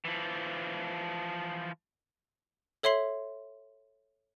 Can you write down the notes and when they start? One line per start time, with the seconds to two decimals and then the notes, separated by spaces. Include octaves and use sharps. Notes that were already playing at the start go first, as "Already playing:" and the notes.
0.05 E3 F3
2.83 A4 C#5 E5 C6 C7 F#7